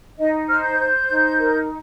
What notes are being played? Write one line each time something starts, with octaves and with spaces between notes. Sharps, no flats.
D#4 D#5
C5 F6
G6
C5
D#4
A#4